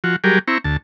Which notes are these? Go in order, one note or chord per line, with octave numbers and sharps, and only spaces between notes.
F3 F#4
F#3 G3 G4 G#4 A#4
C4 E4 A#5 C#6
D2 A5